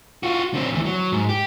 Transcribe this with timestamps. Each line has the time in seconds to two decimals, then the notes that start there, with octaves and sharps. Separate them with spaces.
0.23 F4 F#4
0.54 D3 C4
0.73 D2 E3
0.85 F#3
1.12 G#2
1.29 G4